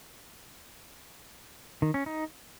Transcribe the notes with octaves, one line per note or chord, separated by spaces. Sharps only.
D#3
C#4
D#4